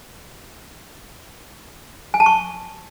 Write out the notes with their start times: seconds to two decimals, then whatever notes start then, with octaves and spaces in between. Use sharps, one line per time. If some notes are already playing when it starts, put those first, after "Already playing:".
2.14 G#5
2.20 A5
2.26 C#6